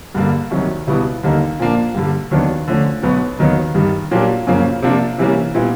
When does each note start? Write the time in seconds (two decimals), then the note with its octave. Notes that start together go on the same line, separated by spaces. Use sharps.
0.15 G2 D3 G3 A#3
0.51 C2 C3 D#3 F#3
0.87 C#2 B2 G3 B3 E4
1.23 D#2 D3 G3 A#3 D#4
1.59 A#2 F3 A#3 D4
1.94 G2 D3 G3
2.31 D#2 D#3 F#3 B3 D4
2.68 D3 F3 A3 C#4
3.03 B1 B2 F#3 B3
3.39 D#2 D#3 F#3 B3 D#4
3.74 G2 D#3 G3
4.11 A#2 F#3 A#3 D4 G4
4.47 F#2 C#3 F3 A#3
4.82 C3 F3 A#3 D4 F4
5.18 C3 E3 G3 A#3 C#4
5.55 A#2 G3 B3 E4